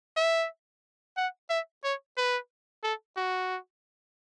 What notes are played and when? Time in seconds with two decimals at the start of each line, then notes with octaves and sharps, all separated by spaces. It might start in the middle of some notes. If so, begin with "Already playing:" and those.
0.17 E5
1.16 F#5
1.50 E5
1.84 C#5
2.17 B4
2.83 A4
3.17 F#4